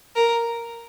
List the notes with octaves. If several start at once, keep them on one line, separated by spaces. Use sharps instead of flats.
A#4